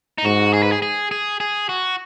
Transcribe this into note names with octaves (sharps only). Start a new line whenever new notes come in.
D#4
G#2 F#4
G#4
B4
G#4
G#4
G#4
G#4
F#4